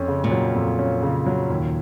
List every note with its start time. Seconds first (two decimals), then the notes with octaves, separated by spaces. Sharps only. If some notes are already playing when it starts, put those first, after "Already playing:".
Already playing: F2 C#4
0.08 C#3
0.24 A#2
0.31 F#3
0.55 F2
0.79 C#4
1.02 C#3
1.26 F#3
1.50 D#2